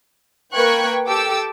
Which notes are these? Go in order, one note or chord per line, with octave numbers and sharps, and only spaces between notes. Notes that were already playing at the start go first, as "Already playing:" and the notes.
A#3 B4 G5 C#6 F#6 G#6
G4 A4 G5 D6 E6